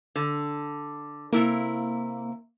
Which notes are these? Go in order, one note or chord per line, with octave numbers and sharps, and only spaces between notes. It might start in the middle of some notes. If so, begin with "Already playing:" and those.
D3
C3 A#3 E4 A#4